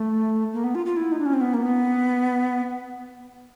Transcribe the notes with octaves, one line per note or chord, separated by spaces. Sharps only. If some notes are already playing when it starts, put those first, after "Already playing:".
Already playing: A3
A#3
B3
F4
F4
E4
D#4
D4
C#4
C4
B3
A#3
B3